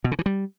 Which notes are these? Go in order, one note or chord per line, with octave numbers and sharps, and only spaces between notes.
B2
C#3
E3
G3